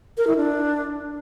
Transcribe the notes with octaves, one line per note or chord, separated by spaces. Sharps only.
A#4
E4
D4